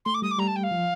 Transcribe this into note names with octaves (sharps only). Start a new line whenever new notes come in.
A3 C6
D6
G3 D#6
D6
G3 A#5
A5
G5
F5
F3